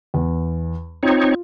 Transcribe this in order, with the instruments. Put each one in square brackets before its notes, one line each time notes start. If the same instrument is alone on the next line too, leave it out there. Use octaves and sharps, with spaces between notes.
[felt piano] E2
[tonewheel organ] C4 D#4 C#5 [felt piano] F4